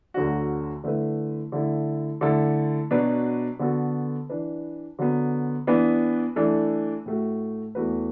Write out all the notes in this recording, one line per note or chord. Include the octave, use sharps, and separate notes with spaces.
D2 D3 F#3 D4 F#4
D3 A3 E4 B4
D3 A3 E4 A4
D3 A3 E4 A4
B2 F#3 D4 B4
D3 B3 F#4 A4
E3 D4 B4
D3 F#3 B3
E3 B3 D4 B4
E3 A3 D4 A4
A2 A3 F#4
E2 E3 A3 F#4 B4